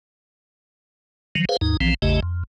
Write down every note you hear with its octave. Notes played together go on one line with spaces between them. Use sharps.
D#3 F3 F#3
G#4 B4 C5 F5
D#2 G#2 D#4
A#1 E3 F3 C4
A1 E2 C#3 A3 G4 D#5
F2